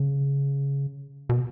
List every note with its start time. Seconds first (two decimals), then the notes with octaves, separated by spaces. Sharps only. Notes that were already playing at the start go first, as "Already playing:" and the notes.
Already playing: C#3
1.29 B2